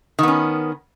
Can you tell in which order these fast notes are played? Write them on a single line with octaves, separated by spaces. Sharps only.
D#3 B3 C#4